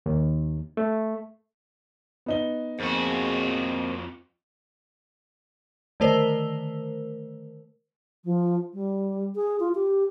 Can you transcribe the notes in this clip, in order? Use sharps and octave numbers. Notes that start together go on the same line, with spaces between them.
D#2
A3
B3 D#4 G7
F2 A#3 C4 F#4 G#4
D3 D#3 A3 A#4 C5
F3
G3
G#4
F4
G4